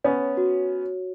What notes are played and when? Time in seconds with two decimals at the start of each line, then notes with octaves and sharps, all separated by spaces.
0.04 B3 C#4 C#5
0.37 F#4